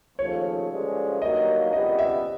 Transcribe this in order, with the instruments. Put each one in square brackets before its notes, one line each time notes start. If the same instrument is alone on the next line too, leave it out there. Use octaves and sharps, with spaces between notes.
[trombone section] D#2 C#3 F3 A3 [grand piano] C#5
[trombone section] G2 D3 F3 G#3 C#4
[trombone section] G2 D#3 F#3 A#3 [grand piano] D#5
[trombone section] C#2 C3 E3 G3 B3 [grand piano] D#5
[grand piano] E5